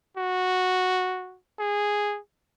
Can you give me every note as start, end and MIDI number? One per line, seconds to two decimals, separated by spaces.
0.17 1.38 66
1.59 2.19 68